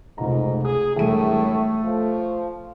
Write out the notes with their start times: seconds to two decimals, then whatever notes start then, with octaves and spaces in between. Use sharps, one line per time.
0.18 F1 C#2 G#2 A#5
0.64 G#4 D#6
0.96 E1 A2 G3 A3 D#7
1.38 A4 C#5
1.84 F3